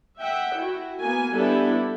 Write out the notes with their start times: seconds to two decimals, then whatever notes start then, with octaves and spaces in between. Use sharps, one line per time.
0.20 E5 F#5 G5
0.57 E4 F#4
1.01 A#3 B3 G#5
1.34 G3 B3 D4 E4 G4 A4